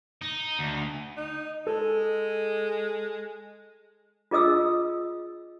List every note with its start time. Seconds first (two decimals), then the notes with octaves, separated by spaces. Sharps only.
0.22 D#4
0.59 D2
1.17 D#4
1.67 G#3 A4
4.31 F4 G#4 D#5 D#6 E6